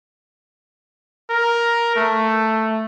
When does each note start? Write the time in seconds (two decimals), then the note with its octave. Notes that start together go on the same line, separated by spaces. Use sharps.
1.30 A#4
1.96 A3